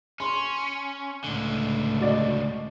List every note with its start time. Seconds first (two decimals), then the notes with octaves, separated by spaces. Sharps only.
0.20 C#4 C6
1.24 C#2 A2 D3
2.01 F#4 D5 D#5